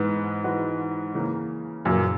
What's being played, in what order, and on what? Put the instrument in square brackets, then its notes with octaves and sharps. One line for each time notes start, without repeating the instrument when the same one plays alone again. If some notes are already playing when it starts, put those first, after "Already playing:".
Already playing: [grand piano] G#2 [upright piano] E3 G#3 B3 B4
[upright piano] E3 G#3 B3 F#4 B4
C#3 E3 A#3
[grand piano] F#2 A#2 [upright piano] C#3 E3 A#3